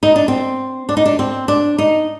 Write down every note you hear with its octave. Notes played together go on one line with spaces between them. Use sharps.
D#4
D4
C4
D4
D#4
D4
C4
D4
D#4